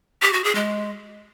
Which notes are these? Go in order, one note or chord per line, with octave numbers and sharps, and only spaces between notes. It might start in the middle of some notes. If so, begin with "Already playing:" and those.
G4
F#4
G#4
G#3